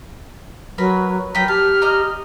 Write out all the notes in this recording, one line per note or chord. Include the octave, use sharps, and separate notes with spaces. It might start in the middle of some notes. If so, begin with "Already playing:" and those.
F#3 A#4 B4 B5
F#3 A#4 B4 G5 B6
G4 A5 F6
D#5 A#5